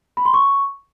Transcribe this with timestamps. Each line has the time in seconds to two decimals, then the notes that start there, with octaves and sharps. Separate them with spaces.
0.17 B5
0.25 C6
0.34 C#6